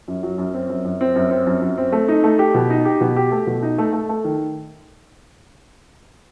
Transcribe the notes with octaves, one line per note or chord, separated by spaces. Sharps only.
F#2
F#3
F#2
C4
F#2
F#2
C4
F#2
C4
F#2
F#2
C4
A3
D#4
A3
G4
B2
D#4
G4
B2
G4
A3
B2
D#4
A3
A3
A3
D#3